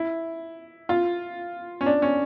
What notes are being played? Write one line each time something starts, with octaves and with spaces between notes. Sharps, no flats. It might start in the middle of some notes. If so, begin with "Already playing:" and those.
Already playing: E4
F4
C#4
D4
C#4